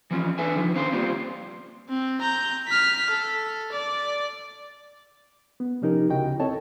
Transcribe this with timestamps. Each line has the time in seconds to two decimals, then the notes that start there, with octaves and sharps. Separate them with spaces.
0.11 E3 F3 C#4
0.38 D4 A4 B4 E5 G#5
0.56 D#3 F3
0.75 C#4 C5 F5 A#5 C6
0.92 G3 A#3 C4 F4 G4
1.90 C4
2.21 A#5 G6
2.68 F6 B6
3.10 A4
3.72 D5
5.60 B3
5.82 C3 F3 C#4 D#4 G4 A#4
6.09 D2 C#3 E4 F#4 D#5 G5
6.40 C4 A4 C#5 D#5 A5